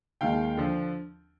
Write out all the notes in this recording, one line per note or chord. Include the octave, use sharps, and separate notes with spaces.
D#2 D#3 G#3 F5 G5
D3 F3